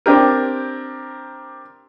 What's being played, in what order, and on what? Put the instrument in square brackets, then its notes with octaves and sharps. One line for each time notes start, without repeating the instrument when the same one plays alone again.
[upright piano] C4 D4 G4 A#4